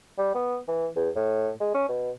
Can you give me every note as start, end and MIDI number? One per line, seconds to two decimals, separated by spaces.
0.18 0.30 55
0.35 0.58 59
0.68 0.88 52
0.96 1.09 40
1.16 1.50 45
1.60 1.70 56
1.74 1.85 61
1.88 2.11 47